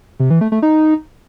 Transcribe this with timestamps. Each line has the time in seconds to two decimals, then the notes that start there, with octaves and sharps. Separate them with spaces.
0.20 C3
0.30 E3
0.41 A3
0.52 A3
0.62 D#4